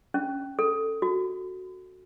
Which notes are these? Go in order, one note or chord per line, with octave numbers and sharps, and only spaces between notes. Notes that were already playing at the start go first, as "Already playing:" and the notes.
C#4
A4
F#4